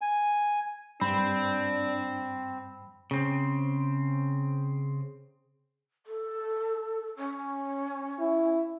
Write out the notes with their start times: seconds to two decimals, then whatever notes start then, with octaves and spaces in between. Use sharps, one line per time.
0.01 G#5
1.01 G2 C4 D4 B5
3.11 C#3 C4
6.06 A4
7.17 C#4
8.20 E4